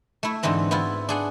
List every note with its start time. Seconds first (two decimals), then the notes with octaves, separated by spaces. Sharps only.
0.23 A3 E4
0.43 G#2 D3 E3 C4 A#5
0.71 B3 C4 E4 F4
1.09 D4 G#4 F#5